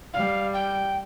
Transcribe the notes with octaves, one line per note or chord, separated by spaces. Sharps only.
G3 F5
G5